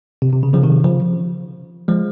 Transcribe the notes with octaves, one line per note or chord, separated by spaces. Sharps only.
C3
C3
C#3
C#3 F3
C3 D#3
C#3 F3
F3 G#3